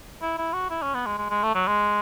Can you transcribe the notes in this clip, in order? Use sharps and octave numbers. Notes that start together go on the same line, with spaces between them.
E4
E4
F#4
E4
C#4
B3
G#3
G#3
G#3
A3
F#3
G#3